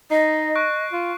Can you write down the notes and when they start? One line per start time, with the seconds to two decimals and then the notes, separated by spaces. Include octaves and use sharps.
0.11 D#4 D#5 C7
0.56 C#6 F#6 D7
0.93 F4